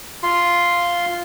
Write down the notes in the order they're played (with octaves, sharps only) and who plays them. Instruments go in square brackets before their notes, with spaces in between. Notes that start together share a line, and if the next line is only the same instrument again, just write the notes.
[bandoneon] F4 C6